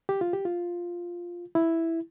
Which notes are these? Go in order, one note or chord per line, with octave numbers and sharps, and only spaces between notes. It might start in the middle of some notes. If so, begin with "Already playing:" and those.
G4
F4
G4
F4
E4